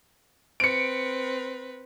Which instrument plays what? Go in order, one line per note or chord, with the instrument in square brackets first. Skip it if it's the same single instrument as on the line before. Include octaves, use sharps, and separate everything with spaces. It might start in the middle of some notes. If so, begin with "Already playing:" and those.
[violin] C4 B4 [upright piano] C#7 D7